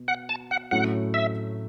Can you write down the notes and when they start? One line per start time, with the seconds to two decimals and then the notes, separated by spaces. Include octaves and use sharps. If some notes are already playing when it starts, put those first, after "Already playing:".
Already playing: B2
0.08 F#5
0.29 A5
0.51 F#5
0.71 A2 F#3 A3 C#4 E4 F#5
1.14 E5